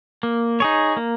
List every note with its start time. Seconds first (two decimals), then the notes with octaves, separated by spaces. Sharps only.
0.23 A#3
0.60 D#4 G#4 C#5
0.97 A#3